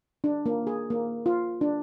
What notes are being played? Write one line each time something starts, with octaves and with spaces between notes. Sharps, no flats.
D4
A#3
G#4
A#3
F4
D4